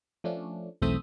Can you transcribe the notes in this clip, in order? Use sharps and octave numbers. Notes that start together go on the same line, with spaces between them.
F3 A3 C#4 D4
B1 E2 A3 C4 E5 D#6